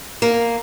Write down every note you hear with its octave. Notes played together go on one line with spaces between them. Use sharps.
A#3